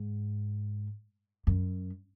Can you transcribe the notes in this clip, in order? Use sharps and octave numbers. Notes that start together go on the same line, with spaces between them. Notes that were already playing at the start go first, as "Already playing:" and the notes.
Already playing: G#2
F#2